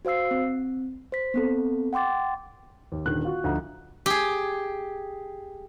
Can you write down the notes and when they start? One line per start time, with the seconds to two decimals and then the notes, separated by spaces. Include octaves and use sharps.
0.05 F#4 C5 F5 E6 C7
0.31 C4
1.12 C5 B6
1.34 B3 C4 A4
1.93 F#5 G5 C6 D6 A6
2.92 D#2
3.06 D#1 D3 D#3 F#6
3.25 F4 F#4
3.44 D2 F3 D#4
4.06 G4 G#4